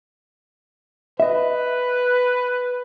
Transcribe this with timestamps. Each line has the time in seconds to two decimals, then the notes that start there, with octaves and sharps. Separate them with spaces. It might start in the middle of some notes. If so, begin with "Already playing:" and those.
1.20 B4 D#5 E5